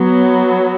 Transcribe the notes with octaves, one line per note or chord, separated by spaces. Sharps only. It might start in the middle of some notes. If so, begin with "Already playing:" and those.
Already playing: F#3 B3